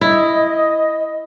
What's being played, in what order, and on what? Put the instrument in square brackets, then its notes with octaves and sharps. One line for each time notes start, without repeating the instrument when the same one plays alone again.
[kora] E4 [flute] D#5